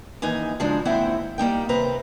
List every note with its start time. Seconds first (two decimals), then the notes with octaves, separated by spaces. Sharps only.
0.22 D#2 E3 D#4 G#5
0.60 C#3 F3 F#3 G#3 D4
0.85 D#2 G#2 C4 E4 C5 F#5
1.38 G3 A#3 D#4 G5
1.69 D#2 C3 C4 B4 A#5